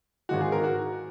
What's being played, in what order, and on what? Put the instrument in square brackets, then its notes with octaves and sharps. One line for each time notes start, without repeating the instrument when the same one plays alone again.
[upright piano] G#1 G#2 D#3 G#3 F#4
G#4
A#4
F#4